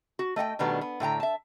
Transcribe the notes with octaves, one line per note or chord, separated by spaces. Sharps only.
F#4
A3 D#5 F#5 G5
B2 D#3 G3 A3 B3 D4
B3
A2 D3 G5 A#5
E5 A5